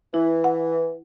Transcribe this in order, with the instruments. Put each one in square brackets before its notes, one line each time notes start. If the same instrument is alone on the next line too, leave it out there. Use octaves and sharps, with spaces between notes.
[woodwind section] E3 [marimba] E4
[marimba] F#5